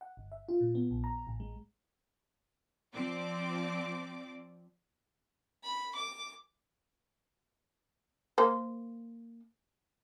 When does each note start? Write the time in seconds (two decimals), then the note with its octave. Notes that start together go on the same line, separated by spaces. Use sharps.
0.01 F#5
0.17 G1
0.32 E5
0.49 F4
0.61 A#2
0.75 B3
0.91 A#1
1.04 A#5
1.27 A1
1.40 G#3
2.93 F3 C4 D5 D6
5.63 B5
5.95 D6
8.38 A#3 C5